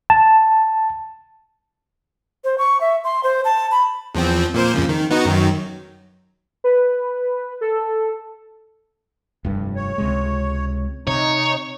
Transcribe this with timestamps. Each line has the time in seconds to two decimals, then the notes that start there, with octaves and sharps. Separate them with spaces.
0.10 A5
2.44 C5
2.58 C#6
2.81 E5
3.04 C6
3.24 C5
3.45 A5
3.71 B5
4.15 E2 F3 C4
4.54 A#2 A#3 C5
4.74 F2 C#3 F3
4.89 D#3
5.11 B3 D#4 F#4
5.25 F#2 D#3 F#3
6.64 B4
7.61 A4
9.45 F1 G2
9.76 C#5
9.98 C#2 C3 G#3
11.07 C3 D#4 C#5